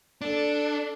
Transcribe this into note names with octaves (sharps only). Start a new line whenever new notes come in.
D4 A4